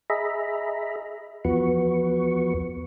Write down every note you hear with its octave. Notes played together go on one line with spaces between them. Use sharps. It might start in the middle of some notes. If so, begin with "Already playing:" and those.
G#4 D#5 E5 A#5 B5
E2 F3 B3 F#4 B4 C#6